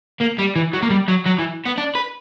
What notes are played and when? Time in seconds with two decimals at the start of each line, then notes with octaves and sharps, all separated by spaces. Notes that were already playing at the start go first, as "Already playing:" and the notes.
0.21 A#3
0.39 G3
0.56 E3
0.73 F#3
0.82 A#3
0.90 G3
1.08 F#3
1.26 F#3
1.39 E3
1.66 B3
1.78 D4
1.95 B4